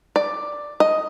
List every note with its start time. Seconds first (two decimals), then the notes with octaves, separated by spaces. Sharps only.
0.16 D5
0.80 D#5